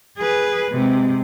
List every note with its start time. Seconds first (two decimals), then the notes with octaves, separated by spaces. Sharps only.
0.17 G#4 B4
0.71 C3 G#3